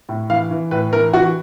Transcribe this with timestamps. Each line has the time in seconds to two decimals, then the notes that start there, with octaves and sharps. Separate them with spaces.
0.09 A2
0.30 E3 F5
0.51 E3
0.71 A2 B4
0.93 E3 A#4
1.13 E3 F#4